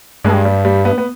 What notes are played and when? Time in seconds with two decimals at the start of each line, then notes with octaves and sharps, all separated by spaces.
0.24 G2 G#3
0.45 G3
0.65 G3
0.85 B3
0.98 B3